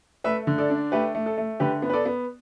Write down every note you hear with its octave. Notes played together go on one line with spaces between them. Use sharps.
A3 B4 E5
D3
A4 D5
D4
A3 G4 B4
A3
A4
A3
D3 G4 B4
B3
B4
A4 D5
B3